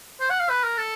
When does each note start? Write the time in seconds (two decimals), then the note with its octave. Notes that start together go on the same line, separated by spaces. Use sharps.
0.20 C5
0.30 F#5
0.40 F5
0.49 B4
0.64 A#4
0.78 A4